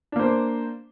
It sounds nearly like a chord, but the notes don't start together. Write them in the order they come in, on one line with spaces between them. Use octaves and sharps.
D4 A#3 C5